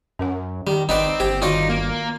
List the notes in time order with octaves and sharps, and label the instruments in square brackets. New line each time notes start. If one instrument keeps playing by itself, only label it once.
[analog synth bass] F#2 [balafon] C#4 A#4 F#5
[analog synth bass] D#3 [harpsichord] G3
[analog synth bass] G#1 [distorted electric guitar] C4 [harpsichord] D#4 B4 D5 [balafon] F#5 G5 A#5
[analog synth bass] G1 [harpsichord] G4 [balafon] C5 G5
[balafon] D#3 F#4 [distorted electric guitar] D#4 [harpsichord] F4 D5
[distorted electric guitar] A#3